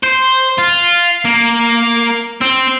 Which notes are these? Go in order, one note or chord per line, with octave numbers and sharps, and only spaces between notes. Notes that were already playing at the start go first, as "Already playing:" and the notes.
C5
F4
A#3
C4